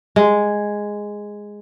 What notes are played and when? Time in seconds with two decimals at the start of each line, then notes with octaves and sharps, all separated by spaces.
0.16 G#3